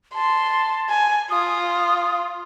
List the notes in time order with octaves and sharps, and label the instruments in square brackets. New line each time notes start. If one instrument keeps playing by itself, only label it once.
[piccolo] A5 [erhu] C6
[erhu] G#5
[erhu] F4 [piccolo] D#6